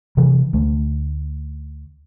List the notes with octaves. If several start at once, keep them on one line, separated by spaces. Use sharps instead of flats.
C3 E3 F#3
D2 A3